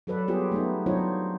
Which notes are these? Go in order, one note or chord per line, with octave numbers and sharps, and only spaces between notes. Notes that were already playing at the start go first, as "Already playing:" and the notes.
F#3 A4 B4 D5
G3 B3 F4 G4 G#4
A3 B3 D#4
F#3 D4 D#4 F4 C5 C#5